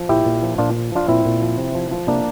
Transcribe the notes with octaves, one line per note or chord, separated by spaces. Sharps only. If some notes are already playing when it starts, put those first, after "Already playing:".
Already playing: F3
A#2 E4 G4
A#2
F3
A#2 D4 F4
F3
F3 D4 F4
A#2 C4 E4
A#2
F3
C3
F3
F3
C3 A#3 D4